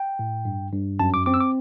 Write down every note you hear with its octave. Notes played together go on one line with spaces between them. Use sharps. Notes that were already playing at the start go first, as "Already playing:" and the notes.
Already playing: G5
A2
G2
G2
F#2 A5
D6
C4 D6
E6
D6